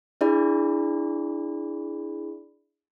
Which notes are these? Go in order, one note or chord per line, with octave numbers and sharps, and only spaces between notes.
D4 E4 G#4 D5 E5 B5